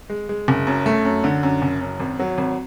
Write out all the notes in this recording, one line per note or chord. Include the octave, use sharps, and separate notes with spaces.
G#3
G#3
F#1
F#2
A3
F#2
D3
F#2
F#1
F#2
G#1
F#3
G#1